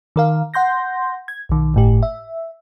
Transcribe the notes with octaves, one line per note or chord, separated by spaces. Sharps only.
D#3 A#4 F5
F#5 C6 G6 A#6
G#6
B1 D#3
G1 A2 G4
E5